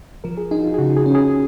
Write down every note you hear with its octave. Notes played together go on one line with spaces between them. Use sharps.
F3 A#4
G#4
D#4 G#4
F#4
F4
G#4
C#3 F#4
G#4
C#4
G#4